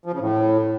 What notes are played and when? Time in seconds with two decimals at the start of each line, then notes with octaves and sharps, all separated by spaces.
0.06 F3
0.13 C#3
0.20 A2